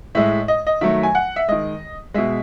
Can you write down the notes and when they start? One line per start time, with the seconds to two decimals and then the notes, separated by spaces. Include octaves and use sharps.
0.15 A2 G#3 E5
0.48 D#5
0.67 D#5
0.81 D#3 F#3 A3 E5
1.03 G#5
1.15 F#5
1.36 E5
1.48 D#3 G#3 D#5
2.14 B2 G#3 E5